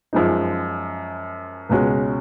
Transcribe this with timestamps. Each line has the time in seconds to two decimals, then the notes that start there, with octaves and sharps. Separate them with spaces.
0.13 F#2 F3 G#3 D#4
1.69 C#2 B2 G#3 C#4 F#4